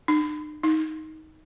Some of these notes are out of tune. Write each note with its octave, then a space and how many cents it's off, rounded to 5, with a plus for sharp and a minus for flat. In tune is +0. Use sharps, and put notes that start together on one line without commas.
D#4 -45
D#4 +15